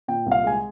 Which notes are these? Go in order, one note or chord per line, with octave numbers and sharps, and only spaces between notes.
A#2 G5
C2
F5
G#3 G#5